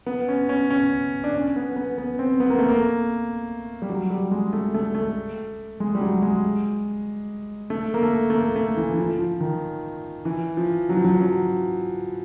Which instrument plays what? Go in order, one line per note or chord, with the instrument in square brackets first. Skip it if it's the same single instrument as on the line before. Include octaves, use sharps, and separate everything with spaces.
[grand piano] B3
C#4
C#4
C#4
D4
C#4
B3
B3
B3
C4
B3
A#3
A3
A#3
G3
F#3
G3
G#3
A3
A3
A3
G#3
G3
F#3
G#3
A3
A#3
A3
A3
A#3
A3
E3
E3
F3
F3
D#3
E3
F3
F#3
F3
F#3
F#3